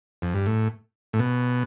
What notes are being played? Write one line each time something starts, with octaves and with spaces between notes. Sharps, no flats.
F2
G2
A2
A2
B2